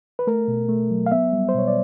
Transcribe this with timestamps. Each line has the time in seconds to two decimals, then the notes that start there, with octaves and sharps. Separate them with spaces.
0.19 B4
0.27 A3 A#4
0.48 B2
0.69 A3
0.91 F#3
1.06 F5
1.12 B3 E5
1.33 G3
1.49 C5
1.54 B2 C#5
1.68 D5